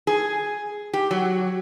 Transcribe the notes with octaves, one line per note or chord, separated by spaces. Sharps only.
G#4
G4
F#3